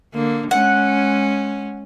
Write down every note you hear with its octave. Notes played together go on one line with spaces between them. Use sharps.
D3 A#3
G#3 C#4 F#5